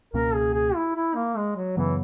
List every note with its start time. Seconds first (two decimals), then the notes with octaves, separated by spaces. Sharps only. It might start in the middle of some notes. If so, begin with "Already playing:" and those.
0.14 C#2 B2 A#3 C#4 A#4
0.35 G#4
0.54 G#4
0.75 E4
0.96 E4
1.15 A#3
1.37 G#3
1.56 F#3
1.77 F#2 C#3 E3 F#3 B3